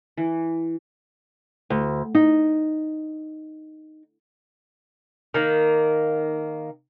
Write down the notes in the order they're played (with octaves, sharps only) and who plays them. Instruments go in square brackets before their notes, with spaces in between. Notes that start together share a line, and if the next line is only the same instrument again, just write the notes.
[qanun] E3
[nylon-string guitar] D2
D#4
[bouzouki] D#3 A#3